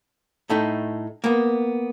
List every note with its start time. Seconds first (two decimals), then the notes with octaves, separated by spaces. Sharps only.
0.50 A2 A3 D#4
1.24 A#3 B3